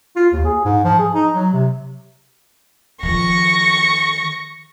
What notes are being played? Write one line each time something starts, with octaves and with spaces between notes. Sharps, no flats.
F4
D#2
G#4
G#2
F3
G#4
D#4
F#3
C3
D#3 F3 C#6 A#6